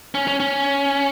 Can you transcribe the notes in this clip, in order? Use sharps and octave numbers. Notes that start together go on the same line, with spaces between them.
C#4
C#4
C#4